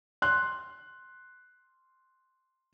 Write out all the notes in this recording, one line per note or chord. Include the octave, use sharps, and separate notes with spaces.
C6 F#6